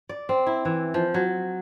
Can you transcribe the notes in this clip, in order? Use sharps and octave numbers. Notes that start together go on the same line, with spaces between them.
D5
C4
E4
E3
F3
F#3